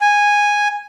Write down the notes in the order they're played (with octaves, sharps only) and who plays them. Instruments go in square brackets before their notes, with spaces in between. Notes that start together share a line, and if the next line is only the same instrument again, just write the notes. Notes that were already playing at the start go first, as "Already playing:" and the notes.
[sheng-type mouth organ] G#5